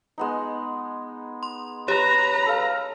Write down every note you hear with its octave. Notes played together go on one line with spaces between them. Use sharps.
G#3 B3 D#4
C6
G4 B4 C#5 A#5
A4 F5